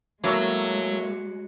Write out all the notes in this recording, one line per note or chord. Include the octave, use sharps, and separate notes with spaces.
A2 F#3 G#3 A#3 A4